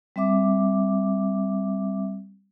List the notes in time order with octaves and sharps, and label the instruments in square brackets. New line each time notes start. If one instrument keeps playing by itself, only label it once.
[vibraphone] G3 C4 E5 D6